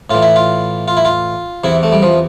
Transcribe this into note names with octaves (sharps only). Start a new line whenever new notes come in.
A2 E3 F4
E4
F4
F4
E4
F4
E2 C3 E3 E4
A3
G3
F3